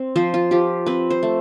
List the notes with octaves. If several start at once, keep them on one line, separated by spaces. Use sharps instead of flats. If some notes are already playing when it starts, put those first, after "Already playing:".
Already playing: C4
F3 C5
F4
F3 G4
C4 B4
C5
A3